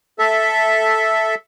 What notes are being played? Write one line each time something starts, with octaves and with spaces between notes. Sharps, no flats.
A4 E5